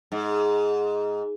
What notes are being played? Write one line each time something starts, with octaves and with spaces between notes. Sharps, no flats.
G#2